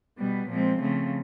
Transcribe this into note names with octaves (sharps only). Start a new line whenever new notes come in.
B2 G3 B3
A#2 F3 G#3 C4
C#3 F3 A3 C4